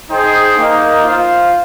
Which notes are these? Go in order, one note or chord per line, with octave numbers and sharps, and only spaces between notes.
D#4 G#4 C5 D#5 G5
A#3 D#4 A#4 D#5
F4 C5 F5